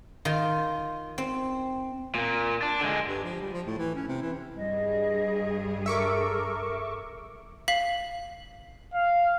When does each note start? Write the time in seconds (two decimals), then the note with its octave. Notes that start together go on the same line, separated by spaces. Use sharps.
0.25 D#3 F4 C6
1.18 C4
2.15 A#2 A#3
2.62 D4
2.81 D3 G#3
3.08 G2
3.24 F3
3.41 G3
3.53 F3
3.66 A2
3.78 E3
3.95 C#4
4.08 C3
4.22 E3
4.57 G2 G3 G#4 D#5
5.86 A4 A#4 E5 C#6 D6
7.68 F5 B6 F#7
8.94 F5